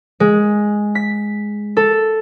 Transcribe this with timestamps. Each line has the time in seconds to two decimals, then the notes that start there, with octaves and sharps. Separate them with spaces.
0.20 G#3
0.95 B6
1.77 A4